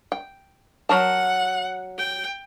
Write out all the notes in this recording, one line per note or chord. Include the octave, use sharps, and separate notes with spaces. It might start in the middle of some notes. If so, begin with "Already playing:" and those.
G5
F#3 A#4 F#5 A5
G5